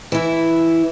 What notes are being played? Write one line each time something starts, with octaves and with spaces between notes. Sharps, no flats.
E3 E4